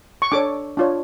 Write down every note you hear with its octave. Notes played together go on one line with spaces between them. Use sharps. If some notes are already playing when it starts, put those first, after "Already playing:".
C#6
D4 A4 C#5 D6
D4 F4 C#5